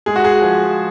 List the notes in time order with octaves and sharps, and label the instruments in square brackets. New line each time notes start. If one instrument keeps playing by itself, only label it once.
[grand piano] G#3 G#4
F#4
G#4
F3